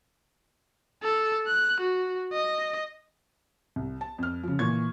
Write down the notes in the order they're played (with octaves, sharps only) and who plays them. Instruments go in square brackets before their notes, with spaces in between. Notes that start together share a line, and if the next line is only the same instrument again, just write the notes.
[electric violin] A4
F#6
F#4
D#5
[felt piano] C2
A5
F2 F6
C#3 F3
A#2 E3 C#6 G#6